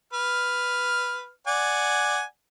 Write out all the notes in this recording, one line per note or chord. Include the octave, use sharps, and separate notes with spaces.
B4 F6
D5 F#5 G#5